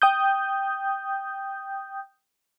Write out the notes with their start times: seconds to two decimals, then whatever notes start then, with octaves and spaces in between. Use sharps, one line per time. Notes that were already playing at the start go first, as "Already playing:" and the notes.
0.02 G5 D#6 G6